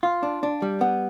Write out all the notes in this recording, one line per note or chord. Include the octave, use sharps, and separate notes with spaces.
F4 F5
D4
D4
G3
B3 F#5